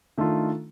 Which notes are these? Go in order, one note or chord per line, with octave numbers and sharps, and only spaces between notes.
D#3 A3 D4 F4 A4